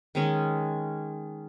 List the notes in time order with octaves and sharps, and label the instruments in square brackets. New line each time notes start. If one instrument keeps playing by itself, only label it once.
[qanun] D#3 G#3 C#4